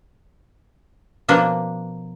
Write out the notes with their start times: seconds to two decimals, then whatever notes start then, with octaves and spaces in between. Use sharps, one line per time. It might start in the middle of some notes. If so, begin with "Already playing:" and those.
1.28 B2 F3 A#3 D4